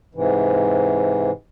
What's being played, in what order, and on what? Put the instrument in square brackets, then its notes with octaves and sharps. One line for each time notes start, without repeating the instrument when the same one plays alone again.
[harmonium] G#2 C3 E3